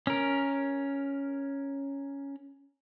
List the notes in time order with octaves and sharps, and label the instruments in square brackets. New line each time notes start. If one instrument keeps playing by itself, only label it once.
[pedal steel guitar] C#4 A#4